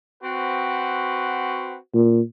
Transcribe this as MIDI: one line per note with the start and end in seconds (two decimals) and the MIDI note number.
0.24 1.76 60
0.24 1.76 66
0.24 1.76 71
1.94 2.21 46